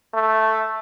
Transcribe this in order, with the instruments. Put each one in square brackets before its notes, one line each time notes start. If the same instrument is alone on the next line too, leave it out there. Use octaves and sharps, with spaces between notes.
[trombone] A3